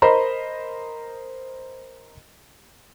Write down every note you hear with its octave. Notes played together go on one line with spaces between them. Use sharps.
A#4 C5 D#5 A#5 B5